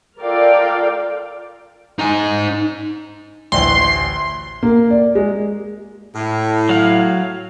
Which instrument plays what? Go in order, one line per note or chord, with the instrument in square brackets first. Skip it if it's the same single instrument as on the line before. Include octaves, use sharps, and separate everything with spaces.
[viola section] F4 A4 A#4 D5 F5 G5
[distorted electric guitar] D#4 G#5
[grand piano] A1 D2 [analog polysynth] C6
[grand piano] A#3
D5
G#3
[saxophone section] A2
[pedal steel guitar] F#3 F5